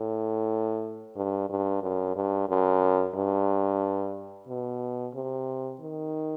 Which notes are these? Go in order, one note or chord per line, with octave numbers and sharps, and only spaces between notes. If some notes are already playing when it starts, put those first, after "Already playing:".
Already playing: A2
G2
G2
F#2
G2
F#2
G2
B2
C3
D#3